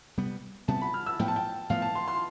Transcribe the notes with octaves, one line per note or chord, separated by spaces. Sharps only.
C3 G3 B3
C3 G3 B3 A5
B5
F6
E6
A2 F3 B3 G5
A5
G5
A2 F3 B3 F5
A5
C6
C6